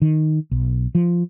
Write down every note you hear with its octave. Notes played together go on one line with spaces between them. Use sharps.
D#3
B1
F3